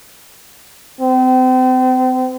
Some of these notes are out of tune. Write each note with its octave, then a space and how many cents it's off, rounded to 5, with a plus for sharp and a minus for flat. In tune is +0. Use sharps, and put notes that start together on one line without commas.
C4 -35